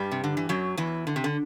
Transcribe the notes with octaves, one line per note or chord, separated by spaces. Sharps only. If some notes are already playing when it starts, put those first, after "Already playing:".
Already playing: G2 G3
C3
D3
E3
F#2 F#3
E2 E3
D3
C3
D3